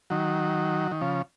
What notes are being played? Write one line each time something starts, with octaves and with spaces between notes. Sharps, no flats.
D#3 F#3
D#3
C#3 F3